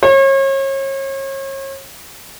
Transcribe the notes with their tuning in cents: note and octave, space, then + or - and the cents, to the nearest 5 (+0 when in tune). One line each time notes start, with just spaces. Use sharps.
C#5 -35